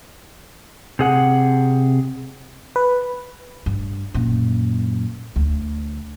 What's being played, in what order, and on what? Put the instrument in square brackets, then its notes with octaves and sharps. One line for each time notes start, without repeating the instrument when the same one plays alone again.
[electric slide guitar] C3 G#4 F#5
[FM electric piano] B4
[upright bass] G2
F#2 A#2
D2